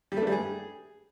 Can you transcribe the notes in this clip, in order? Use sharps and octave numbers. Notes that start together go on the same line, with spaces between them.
G3
A3
D4
G3
G#4